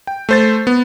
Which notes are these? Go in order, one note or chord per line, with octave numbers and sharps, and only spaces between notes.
G5
A3 C5 A6
B3